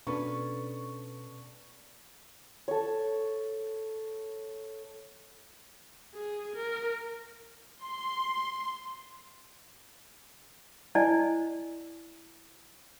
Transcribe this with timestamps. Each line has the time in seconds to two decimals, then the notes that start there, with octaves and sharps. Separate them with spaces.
0.07 B2 C#4 D4 A4 B4 C#6
2.68 A4 C#5
6.14 G#4
6.55 A#4
7.83 C6
10.95 E4 C5 D5 D#5 G#5 A5